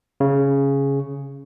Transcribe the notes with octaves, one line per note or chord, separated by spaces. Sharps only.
C#3